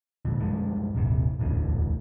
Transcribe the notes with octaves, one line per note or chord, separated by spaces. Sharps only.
D#1 A#1 F2 D3
F#2 F3 G3 G#3
D#1 G#1 C3 C4
E1 A1 D2 D3